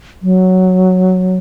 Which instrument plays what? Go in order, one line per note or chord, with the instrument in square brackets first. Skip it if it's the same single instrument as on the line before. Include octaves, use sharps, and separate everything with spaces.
[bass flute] F#3